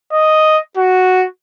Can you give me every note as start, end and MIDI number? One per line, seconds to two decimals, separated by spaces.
0.12 0.59 75
0.77 1.26 66